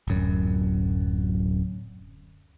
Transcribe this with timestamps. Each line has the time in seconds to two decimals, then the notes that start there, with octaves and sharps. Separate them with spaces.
0.08 D1 F#2